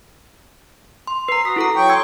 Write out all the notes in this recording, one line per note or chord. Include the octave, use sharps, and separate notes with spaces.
C6
B4 A#5 C7
F#4 D#6 B6
E4 A4 A#5
F#3 G5 C#6
C6 D#6 E6 G#6